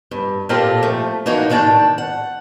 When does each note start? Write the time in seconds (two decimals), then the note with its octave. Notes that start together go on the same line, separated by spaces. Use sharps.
0.11 G2
0.49 A#2 C4 F4 G4 A4 A#4
0.83 F3 A3
1.26 E3 A#3 D4 D#4 F#4 C#5
1.50 C3 D#3 D4 G5 A5
1.98 F#5